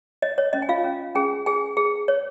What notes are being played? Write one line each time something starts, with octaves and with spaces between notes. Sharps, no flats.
C#5 D#5
C#5
C#4 D#5
G#5
F4 F5
C#4
C#4 G#4 G#5
G#4 G#5
G#4
C#5